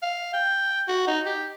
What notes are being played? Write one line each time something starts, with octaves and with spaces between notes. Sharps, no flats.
F5
G5
F#4
D#4
G4